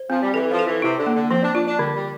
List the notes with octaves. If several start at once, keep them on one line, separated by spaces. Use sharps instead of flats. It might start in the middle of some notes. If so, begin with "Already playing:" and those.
Already playing: C5
F3 C4
G3
E3 A4
F3
A4
E3
C3 E4
D3
A#3
D3
F3 C4
D4
D4 F4
D4
D3 G3
G3